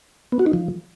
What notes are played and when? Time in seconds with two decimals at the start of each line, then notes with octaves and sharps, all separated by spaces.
0.32 B3
0.39 F#4
0.46 D#4
0.53 F3